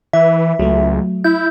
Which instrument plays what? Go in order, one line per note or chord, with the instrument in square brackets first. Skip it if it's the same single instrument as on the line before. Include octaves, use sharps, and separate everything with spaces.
[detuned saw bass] E3 [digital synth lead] E5
[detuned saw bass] C#2 [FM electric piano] F#3 A3
[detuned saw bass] E4 [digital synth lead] G6